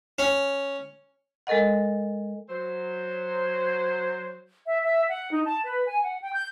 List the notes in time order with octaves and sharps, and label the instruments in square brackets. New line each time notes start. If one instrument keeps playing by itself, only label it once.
[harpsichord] C#4
[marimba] G#3 A4 A#4 D#5 F#5
[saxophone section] F#3 C5
[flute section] E5
E5
F#5
D#4
A5
B4
G#5
F#5
G5
G6